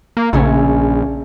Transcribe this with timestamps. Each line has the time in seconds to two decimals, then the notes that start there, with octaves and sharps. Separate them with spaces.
0.17 A#3
0.33 A#1 C#3 A3 C#4